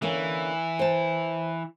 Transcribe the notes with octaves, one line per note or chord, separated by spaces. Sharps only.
D3 E3 A#3 C#4
C5 A5